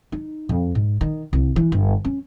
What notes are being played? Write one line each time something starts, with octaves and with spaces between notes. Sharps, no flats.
D#4
F2
G#2
D#3
C2
E3
G1
C#4